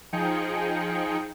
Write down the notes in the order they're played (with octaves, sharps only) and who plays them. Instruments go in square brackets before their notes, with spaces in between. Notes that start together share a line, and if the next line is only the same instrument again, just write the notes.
[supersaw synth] F3 D#4 G#4 G5 C#7